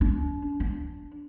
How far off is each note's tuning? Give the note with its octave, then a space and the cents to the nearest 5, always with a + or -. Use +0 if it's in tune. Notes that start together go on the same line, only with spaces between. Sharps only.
D4 -40
D4 -15